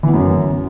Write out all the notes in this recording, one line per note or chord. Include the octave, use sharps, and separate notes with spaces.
E3
B3
F#2